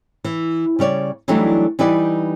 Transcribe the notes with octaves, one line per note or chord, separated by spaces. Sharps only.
E3
C#3 G3 C#5 D5
E3 F#3 G3 A3 D4 D#4
E3 G3 D#4 G4 B4 D5